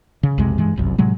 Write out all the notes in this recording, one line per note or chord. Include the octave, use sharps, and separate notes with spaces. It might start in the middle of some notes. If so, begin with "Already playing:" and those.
C#3
B1 F2 C3 G#3
G2 E3 G#3
G1 C2 F#2
A2 C3 F#3 G#3